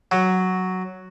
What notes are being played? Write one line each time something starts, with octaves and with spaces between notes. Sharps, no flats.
F#3